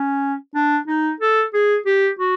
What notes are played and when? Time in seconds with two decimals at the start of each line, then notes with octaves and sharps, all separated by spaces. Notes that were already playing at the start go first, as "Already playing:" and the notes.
Already playing: C#4
0.55 D4
0.87 D#4
1.20 A4
1.54 G#4
1.86 G4
2.19 F#4